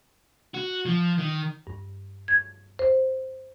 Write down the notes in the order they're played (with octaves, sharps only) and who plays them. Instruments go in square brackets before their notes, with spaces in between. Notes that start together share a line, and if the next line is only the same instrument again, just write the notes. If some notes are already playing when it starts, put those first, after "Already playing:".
[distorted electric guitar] F#4
F3
D#3
[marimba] G2
G#6
C5